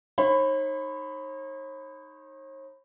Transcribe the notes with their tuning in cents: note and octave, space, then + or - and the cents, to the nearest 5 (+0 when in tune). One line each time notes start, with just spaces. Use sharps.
D#4 +0 C#5 -45 B5 +15